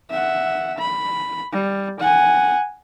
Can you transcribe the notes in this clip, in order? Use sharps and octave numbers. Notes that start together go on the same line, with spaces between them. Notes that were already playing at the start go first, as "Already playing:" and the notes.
E5 F#5
B5
G3
F#5 G#5